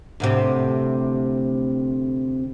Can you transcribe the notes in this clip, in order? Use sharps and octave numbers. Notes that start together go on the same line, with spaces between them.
D2 A2 C3